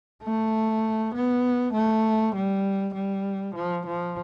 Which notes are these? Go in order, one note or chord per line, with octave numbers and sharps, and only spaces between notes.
A3
B3
A3
G3
G3
F3
F3